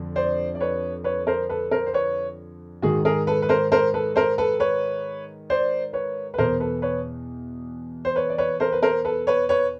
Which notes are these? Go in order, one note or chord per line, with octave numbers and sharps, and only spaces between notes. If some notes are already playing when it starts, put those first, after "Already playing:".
Already playing: F2 D3
C5 D5
D5
B4 C#5
B4 C#5
A#4 C5
A4 B4
A#4 C5
C5
B4 C#5
G#2 D#3 F#4 G#4
G#4 A#4
A4 B4
B4
A#4 C5
A#4 C5
A4 B4
A#4 C5
A4 B4
B4 C#5
C5 D5
B4 C#5
B4
E2 B2 A#4 C5
A4 B4
B4 C#5
C5
B4 C#5
D5
B4 C#5
A#4 C5
B4
A#4 C5
A4 B4
B4 C#5
B4 C#5